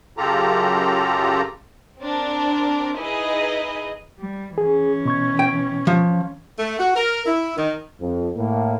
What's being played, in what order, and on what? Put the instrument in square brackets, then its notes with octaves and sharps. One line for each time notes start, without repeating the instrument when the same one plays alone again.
[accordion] F#2 C#3 F4 G4 A4 A#5
[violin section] C4 D4 A#4
D#4 E4 G#4 B4 D#5
[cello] G3
[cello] E3 C#4 [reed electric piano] G#4
[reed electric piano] B2 C#6 G#6
[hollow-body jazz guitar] G5
F3
[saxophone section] A3
F#4
A#4
E4
D#3
[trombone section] F2
A2 A#3